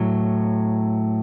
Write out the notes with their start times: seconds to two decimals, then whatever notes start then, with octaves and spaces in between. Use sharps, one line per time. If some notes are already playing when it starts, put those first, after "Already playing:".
Already playing: A2 F#3